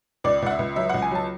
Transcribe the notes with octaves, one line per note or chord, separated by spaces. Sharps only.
C#2 D5
C#2 F#5
E5
C#2
F#3 E5
C#2 F#5
G#5
F#3 A5